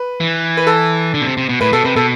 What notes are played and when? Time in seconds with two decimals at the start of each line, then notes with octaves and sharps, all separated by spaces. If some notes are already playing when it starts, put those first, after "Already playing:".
Already playing: B4
0.20 E3
0.57 B4
0.67 A4
1.14 D3
1.21 B2
1.26 C3
1.37 C3
1.49 B2
1.61 A2 B4
1.73 B2 A4
1.85 C3 B4
1.96 B2 A4